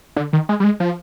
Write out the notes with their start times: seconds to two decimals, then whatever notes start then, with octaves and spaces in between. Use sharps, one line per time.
0.16 D3
0.33 D#3
0.49 G#3
0.60 G3
0.64 G#3
0.80 F3